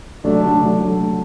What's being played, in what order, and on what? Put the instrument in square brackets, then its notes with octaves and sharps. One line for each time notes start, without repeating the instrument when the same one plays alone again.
[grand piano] F#3 A3 [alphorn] D4
[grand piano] D3 F#3
F#3 A3
F#3 A3